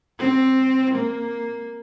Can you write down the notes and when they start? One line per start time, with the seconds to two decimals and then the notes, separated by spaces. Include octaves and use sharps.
0.19 C4
0.95 A#3